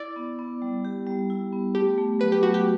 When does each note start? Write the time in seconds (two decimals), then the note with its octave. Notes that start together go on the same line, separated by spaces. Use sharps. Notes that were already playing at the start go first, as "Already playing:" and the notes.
Already playing: E4 D5
0.16 B3
0.39 B3
0.62 G3
0.85 G4
1.07 G3
1.30 E4
1.52 B3
1.75 A3 G4
1.98 A3
2.20 F#3 B4
2.32 G4
2.43 A3 F#4
2.54 G4